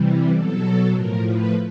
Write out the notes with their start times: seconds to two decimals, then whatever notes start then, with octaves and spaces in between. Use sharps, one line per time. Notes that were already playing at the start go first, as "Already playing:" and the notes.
Already playing: C3 E3 G3
0.32 B2 F#3 A4
0.93 A2 F3 A#4
1.23 B4